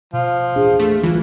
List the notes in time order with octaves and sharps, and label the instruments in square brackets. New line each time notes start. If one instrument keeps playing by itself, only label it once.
[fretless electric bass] B2 [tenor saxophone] F3
[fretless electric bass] A1 D#2 D4 [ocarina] G#4
[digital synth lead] A3
[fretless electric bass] C#2 F3 G3 [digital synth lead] E3 [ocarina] F4